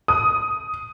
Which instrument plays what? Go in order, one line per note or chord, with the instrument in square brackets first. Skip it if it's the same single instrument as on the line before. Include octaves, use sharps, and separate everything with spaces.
[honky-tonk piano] D#6